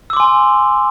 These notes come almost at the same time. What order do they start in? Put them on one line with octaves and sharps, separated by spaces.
E6 D6 C6 G#5